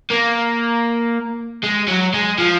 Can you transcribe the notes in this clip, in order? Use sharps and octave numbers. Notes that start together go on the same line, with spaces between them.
A#3
G#3
F#3
G#3
F3